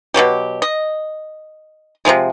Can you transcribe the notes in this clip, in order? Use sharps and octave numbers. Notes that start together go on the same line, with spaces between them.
B2 F3 F#3 G4
D#5
C3 D#3 F3 G#3